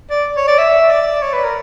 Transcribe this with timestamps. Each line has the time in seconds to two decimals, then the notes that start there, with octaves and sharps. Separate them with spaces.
0.10 D5
0.37 C#5
0.48 D5
0.58 E5
0.90 D5
1.22 C#5
1.33 B4
1.44 A#4